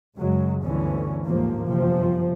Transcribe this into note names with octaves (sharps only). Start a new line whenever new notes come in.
F#2 C#3 F#3 G#3
G1 D2 D3 E3 C#4
A1 D#2 G#2 F3 A#3
G1 F#2 C3 F3